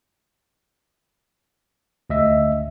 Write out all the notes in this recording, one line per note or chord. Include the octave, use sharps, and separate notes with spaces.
D2 D#5 E5